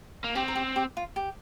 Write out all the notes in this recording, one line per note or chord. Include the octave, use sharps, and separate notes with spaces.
A#3
C4 G4
A#4
G4
G4
F4
G4